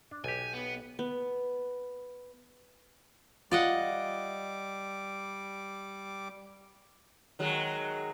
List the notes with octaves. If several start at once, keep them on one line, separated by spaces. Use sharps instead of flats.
D4
B1 G4 G#5
B3
B3
G3 F4 D5 D#5 F#5 D6
D#3 F#3 G#3